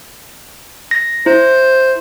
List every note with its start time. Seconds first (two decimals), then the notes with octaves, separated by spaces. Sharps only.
0.91 A#6
1.26 E4 C5